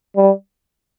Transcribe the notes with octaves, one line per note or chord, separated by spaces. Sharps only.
G3